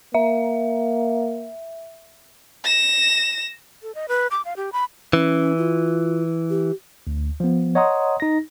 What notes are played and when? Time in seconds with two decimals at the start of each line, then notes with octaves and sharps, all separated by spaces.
0.14 A#3 E5
2.64 A#6 E7
3.83 A4
3.95 D#5
4.08 B4
4.31 D6
4.45 F5
4.57 G4
4.73 B5
5.13 E3 C#4
5.58 F4
6.50 G4
7.07 D2
7.40 F3 B3
7.75 C#5 D#5 F#5 A#5 C6 D#6
8.20 D#4 A#6